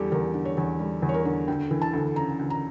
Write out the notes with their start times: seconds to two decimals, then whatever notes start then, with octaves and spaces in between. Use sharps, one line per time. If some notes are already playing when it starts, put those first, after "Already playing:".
Already playing: E2 D3 G3 G4 A4
0.12 E2 A#4
0.34 D3
0.45 C#5
0.57 E2
0.80 G3
1.02 E2
1.09 C#5
1.14 A#4
1.25 D3
1.48 D2 G5
1.71 E3
1.82 A5
1.93 D2
2.16 C#3 A#5
2.39 D2
2.50 A#5